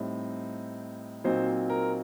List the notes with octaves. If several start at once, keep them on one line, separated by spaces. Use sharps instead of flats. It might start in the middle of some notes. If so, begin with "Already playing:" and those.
Already playing: A2 G3 C4 D#4
A#2 F#3 C4 D#4 C5
A#4